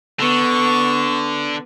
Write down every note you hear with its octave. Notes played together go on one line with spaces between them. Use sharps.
D3 B3 C#6